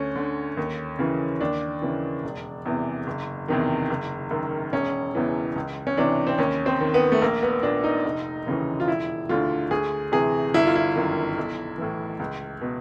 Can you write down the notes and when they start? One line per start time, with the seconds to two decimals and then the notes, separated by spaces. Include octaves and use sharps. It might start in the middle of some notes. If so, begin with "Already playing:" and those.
Already playing: D2 C#4
0.15 D3
0.57 D#2
0.99 C#3 E3
1.40 D#2 D4
1.82 C#3 E3
2.24 E1
2.66 E2 C3 E3
3.07 F#1
3.48 E2 C3 D#3
3.90 F#1
4.31 F#2 D#3
4.73 E1 C#4
5.15 E2 C#3 E3
5.56 C#2
5.87 C#4
5.97 C3 E3 D4
6.27 C4
6.38 D#2 C#4
6.66 C4
6.81 D#3
6.94 B3
7.12 A3
7.22 A#1 A#3
7.42 B3
7.63 A#2 D4
7.84 D#4
8.05 F1
8.47 D#2 C#3 E3
8.80 F4
8.88 E1 E4
9.29 D2 D3 F4
9.71 D2 G#4
10.12 C3 E3 G#4
10.54 G1 E4
10.65 F4
10.75 E4
10.96 F#2 D#3
11.37 B1
11.78 A2 E3
12.19 C#2
12.61 B2